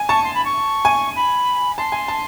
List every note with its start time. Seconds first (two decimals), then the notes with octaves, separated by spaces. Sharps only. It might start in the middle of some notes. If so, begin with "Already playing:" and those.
Already playing: G#5
0.08 A5 C#6
0.24 C6
0.34 B5
0.45 C#6
0.85 G#5
1.16 B5
1.78 A5 C6
1.92 G#5
2.08 A5